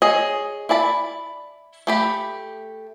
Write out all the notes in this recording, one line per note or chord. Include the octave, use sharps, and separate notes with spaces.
G#4 C#5 D#5
E4 D5 A5 B5
A3 G4 B5